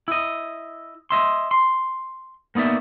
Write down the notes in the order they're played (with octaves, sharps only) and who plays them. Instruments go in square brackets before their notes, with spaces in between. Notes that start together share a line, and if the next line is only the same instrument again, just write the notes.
[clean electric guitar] E4 D#5
D#5 E5 C6
C6
A#3 B3 D#4 D5 E5